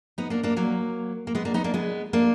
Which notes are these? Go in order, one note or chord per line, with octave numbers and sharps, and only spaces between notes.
B3 D#4
A#3 D4
A#3 D4
F#3 A#3
A#3
G#3 B3
A#3 D4
B3 D#4
A#3 D4
G#3 B3
A#3 D4